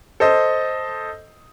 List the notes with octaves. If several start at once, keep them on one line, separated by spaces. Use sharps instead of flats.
A4 C5 D#5